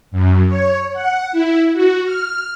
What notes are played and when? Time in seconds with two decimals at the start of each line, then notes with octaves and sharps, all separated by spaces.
0.12 F#2
0.48 C#5
0.93 F#5
1.32 E4
1.73 F#4
2.04 F6